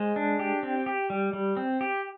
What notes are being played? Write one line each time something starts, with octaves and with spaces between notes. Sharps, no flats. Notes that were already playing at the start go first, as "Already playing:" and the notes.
Already playing: G#3 C5
D4
G4
C4
G4
G3
G3
C4
G4